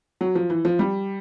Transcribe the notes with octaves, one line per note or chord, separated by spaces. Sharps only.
F#3
F3
E3
F3
G3